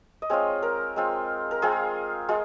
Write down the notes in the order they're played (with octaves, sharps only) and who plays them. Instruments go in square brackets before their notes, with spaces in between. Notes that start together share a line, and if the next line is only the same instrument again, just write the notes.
[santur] D#5
G#3 C4 F4 C#5
A#4
G#3 C4 F4
A#4
G#3 C4 F4 G#4
G#3 F4